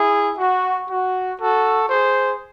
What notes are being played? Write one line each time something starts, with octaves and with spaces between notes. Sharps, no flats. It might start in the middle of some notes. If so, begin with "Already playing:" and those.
Already playing: E4 G#4
F#4
F#4
F#4 A4
G#4 C5